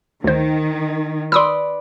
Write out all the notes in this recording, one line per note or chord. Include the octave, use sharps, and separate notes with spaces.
D2 D#3 C5
B4 D5 C6 D#6 E6